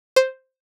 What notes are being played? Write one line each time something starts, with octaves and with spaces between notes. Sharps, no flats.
C5